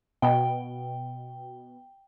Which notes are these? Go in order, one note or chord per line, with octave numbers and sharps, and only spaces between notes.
B2 G5